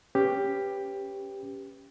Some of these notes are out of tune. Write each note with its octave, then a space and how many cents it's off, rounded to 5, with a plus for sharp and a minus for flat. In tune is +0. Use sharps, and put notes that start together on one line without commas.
C#4 +0 G4 +10 B4 +0